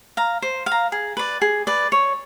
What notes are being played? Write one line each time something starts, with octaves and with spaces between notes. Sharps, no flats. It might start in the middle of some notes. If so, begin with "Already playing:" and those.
F5 A#5
C5
F5
A#5
G#4
B4 D5
G#4
B4 D5
C#5